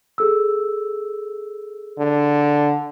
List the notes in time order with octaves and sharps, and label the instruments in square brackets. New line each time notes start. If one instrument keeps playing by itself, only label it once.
[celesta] G#4 A4 E6
[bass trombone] D3